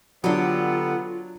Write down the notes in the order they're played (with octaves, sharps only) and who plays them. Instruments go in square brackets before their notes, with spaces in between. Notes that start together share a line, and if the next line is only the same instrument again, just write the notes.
[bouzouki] D3 G4 [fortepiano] F#3 D4 [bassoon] B3 [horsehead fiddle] F4